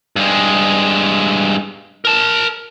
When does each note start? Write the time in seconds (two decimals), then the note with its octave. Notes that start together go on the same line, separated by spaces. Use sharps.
0.16 G2 G#3
2.05 A#4 A5